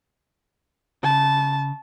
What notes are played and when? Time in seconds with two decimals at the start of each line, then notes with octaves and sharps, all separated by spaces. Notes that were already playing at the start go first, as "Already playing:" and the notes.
1.03 C#3 A5